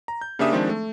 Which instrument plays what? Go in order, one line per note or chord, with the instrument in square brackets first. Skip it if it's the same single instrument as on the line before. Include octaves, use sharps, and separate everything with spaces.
[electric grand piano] A#5
G6
C#3 A#3 D4 G4 E5 D#6
D#3 F3 G#3 C4 D4
A3